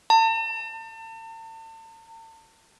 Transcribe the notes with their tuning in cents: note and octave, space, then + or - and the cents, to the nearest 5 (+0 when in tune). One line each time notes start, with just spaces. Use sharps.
A5 +40